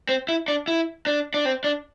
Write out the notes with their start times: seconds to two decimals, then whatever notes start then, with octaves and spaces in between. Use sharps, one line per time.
0.09 C4
0.29 E4
0.48 D4
0.68 E4
1.06 D4
1.34 D4
1.45 C4
1.64 D4